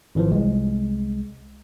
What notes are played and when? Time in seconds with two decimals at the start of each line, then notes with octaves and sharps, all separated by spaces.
0.15 G#1 E3 F3
0.31 C2 G#3